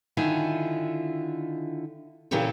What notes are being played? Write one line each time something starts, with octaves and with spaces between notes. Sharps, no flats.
D3 D#3 E4 F4 G#5
A#2 C#3 E3 C#4 G4 A4